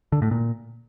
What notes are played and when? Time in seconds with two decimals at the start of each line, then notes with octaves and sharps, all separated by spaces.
0.12 D3
0.22 A2
0.31 A#2